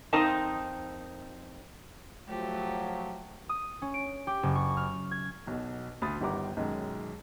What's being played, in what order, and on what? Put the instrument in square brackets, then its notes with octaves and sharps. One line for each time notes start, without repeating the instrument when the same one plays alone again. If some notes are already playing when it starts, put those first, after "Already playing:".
[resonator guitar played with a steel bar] F2 C4 D#4 A#4 D#5 A5
[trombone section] F3 F#3 [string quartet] A3 G4
[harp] D#6
C#4
D7
G4
F#1
C#6
F6
G#6
[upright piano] B1 B2
D2 B5 D#6 A6
G1 D#3 G3 F#5 A#5 D6
B1 F#2 D#3 G#3